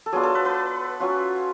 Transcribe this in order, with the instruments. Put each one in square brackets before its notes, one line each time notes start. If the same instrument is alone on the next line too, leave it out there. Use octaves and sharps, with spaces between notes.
[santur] A4
F#3 B3 D4 F4 G#4
A4
B4
B4
F#3 C#4 F4